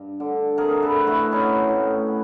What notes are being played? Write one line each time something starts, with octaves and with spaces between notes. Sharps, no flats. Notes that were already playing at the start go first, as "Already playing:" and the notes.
Already playing: G2
D3
C3 G#4 A#4
A4 B4
A3
E4 F#4
B3 C#4 D#4
A2
B3